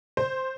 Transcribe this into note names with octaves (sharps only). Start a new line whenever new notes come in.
C5